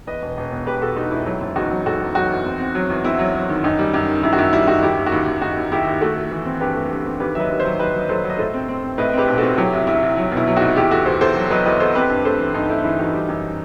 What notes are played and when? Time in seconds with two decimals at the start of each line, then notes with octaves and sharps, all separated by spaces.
0.07 E2 B4 D#5
0.22 E1
0.37 E1
0.52 B2
0.66 E1 G4 B4
0.82 E1 F#4 A4
0.96 E1 D#4 F#4
1.11 E1 E4
1.26 F#3 E4
1.41 F#1
1.55 E2 D#4 F#4
1.71 F#3
1.86 F#1 F#4 A4
2.01 E2
2.15 F#3 D#4 F#4
2.30 E2
2.45 C4
2.60 C4
2.75 F#3
2.90 E2
3.04 C4 E4
3.19 F#3
3.34 F#3
3.49 D#3
3.64 F#2 D#4
3.79 G3
3.94 F#2
4.09 D#3
4.23 F#2 E4
4.33 F#4
4.38 F#2 E4
4.53 G3 E4
4.67 F#2 D#4 F#4
4.82 D#2 E4 G4
4.97 D#2
5.06 F#4
5.12 D#2 E4
5.27 D#2
5.41 D#2 D#4 F#4
5.57 D#2
5.72 D#2 E4 G4
5.87 D#2
6.01 A3 F#4 A4
6.16 A3
6.31 E3
6.45 C4
6.60 G2 G4 B4
6.76 A3
6.91 G2
7.05 C4
7.20 D#2 G4 B4
7.35 F#3 E5
7.40 B4 D#5
7.50 D#2
7.59 C5 E5
7.65 F#3
7.79 F#3 B4 D#5
7.94 F#3
7.99 D#5
8.09 F#3 A4 C5
8.24 F#3
8.30 D#5
8.39 A2 A4 C5
8.54 C4
8.68 C4
8.83 C4
8.98 A2 B4 D#5
9.13 C4 G4 B4
9.28 B1
9.38 C4 F#4 A4
9.57 F#3 E4 G4
9.73 C2
9.87 C2 E4
10.03 C2
10.17 F#3
10.32 B2
10.37 E4
10.47 F#3
10.56 D#4 F#4
10.62 C2
10.76 E2 E4 G4
10.91 E2 F#4 A4
11.06 E2 A4 C5
11.21 E2 A4 C5
11.36 F#3
11.50 F#3 B4 D#5
11.66 E2 B4 D#5
11.80 E2 A4 C5
11.95 C4 G4 B4
12.10 G2
12.25 A3 A4 C5
12.39 E3
12.54 G2 D#4
12.69 A3 E4
12.84 E3 E4
12.99 E3 D#4 F#4
13.13 G3
13.28 F#2